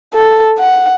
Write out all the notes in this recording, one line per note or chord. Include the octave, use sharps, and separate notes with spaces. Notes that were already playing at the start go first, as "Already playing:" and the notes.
A4
F#5